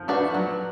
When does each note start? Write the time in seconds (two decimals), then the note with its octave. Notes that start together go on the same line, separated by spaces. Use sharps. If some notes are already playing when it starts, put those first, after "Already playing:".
Already playing: F3
0.08 A3 D4 F#4 B4
0.34 F#3